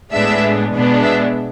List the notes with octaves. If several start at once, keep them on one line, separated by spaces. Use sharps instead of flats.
A2 G#3 B3 D4 E5
B2 G#3 B3 D4
E5